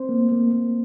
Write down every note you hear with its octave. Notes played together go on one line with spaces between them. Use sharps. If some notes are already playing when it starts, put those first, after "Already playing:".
Already playing: C4 C5
A#3
A#3
A#3